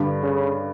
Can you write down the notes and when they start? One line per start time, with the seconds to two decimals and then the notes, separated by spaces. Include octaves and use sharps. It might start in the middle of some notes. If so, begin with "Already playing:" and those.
Already playing: G2 D3 G3
0.23 C#3